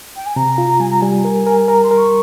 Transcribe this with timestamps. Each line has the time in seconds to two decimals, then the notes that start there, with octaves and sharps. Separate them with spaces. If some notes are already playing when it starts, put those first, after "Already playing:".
0.16 G5
0.26 G#5
0.36 C3 A#5
0.58 F4
0.80 G3 G#5
0.91 A#5
1.01 G3 G#5
1.25 A#4
1.47 A#4
1.68 A#4 A#5
1.83 C6
1.91 A#4
1.98 C#6